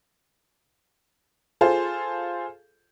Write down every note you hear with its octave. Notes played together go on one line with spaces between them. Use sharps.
F4 G#4 A4 C5